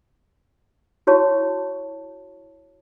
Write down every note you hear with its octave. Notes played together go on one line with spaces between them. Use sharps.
E4 F#4 C#5 A5 C#6